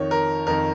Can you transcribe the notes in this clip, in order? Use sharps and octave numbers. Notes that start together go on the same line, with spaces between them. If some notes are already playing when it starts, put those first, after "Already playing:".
Already playing: F2 D#3 C#5
A#4
F2 D#3 A#4